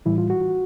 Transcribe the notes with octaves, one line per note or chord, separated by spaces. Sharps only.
A2 E3 G3 E4
F4
F#4